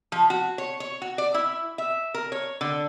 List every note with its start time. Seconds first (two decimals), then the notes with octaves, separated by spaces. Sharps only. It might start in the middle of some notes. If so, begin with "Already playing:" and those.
0.12 F3
0.30 F#4
0.58 C#5
0.80 C#5
1.02 F#4
1.18 D5
1.34 E4
1.78 E5
2.14 A#4
2.32 C#5
2.61 D3